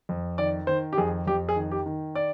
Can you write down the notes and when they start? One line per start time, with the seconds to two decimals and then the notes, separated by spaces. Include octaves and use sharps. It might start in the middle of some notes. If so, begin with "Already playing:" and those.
0.09 F2
0.38 D#3 D5
0.67 D#3 C5
0.93 G4
0.98 F2 G#4
1.27 F2 G4
1.49 G#4
1.56 D#3
1.72 G4
1.86 D#3
2.15 D5